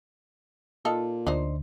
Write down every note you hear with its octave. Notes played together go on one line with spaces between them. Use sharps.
A#2 D#4 F4 A4
D2 D4 D#4 C5